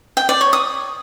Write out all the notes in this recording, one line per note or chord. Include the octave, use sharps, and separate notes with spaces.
G5
D5
C#5
D#6